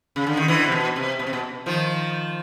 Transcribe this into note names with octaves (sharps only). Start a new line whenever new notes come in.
C#3
D3
D#3
D3 E3
C3
B2
C3
B2
C3
B2
D#3 F3